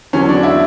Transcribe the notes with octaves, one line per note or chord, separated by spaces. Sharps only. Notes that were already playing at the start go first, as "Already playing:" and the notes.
E2 D3 F#3 C#4
D4
E4